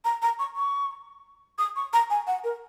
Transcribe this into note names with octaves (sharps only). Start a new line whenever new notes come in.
A#5
A#5
C#6
C#6
D#6
C#6
A#5
G#5
F#5
A#4